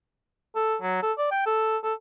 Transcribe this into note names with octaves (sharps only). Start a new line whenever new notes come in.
A4
F#3
A4
D5
G5
A4
A4